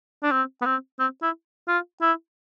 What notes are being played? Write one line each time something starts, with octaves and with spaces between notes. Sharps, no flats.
D4
C4
B3
C4
C4
E4
F4
E4